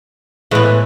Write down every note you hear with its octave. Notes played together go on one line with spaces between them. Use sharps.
A2 E3 G#3 B3